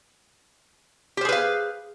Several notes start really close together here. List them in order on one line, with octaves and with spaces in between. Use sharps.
G4 C5 G#4 B4 F5